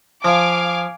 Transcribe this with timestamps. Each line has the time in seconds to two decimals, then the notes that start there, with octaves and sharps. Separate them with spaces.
0.25 F3 F5 G#5 D6